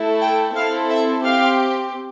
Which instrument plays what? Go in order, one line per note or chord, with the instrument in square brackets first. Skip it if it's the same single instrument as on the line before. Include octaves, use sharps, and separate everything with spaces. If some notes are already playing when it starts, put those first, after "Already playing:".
Already playing: [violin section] A3 E4 A4
G5
C4 E4 A4 F5
E5
C4 G4 F5